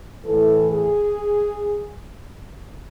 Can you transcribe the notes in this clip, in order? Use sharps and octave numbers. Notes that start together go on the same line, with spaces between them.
A2 E3 A4
G#4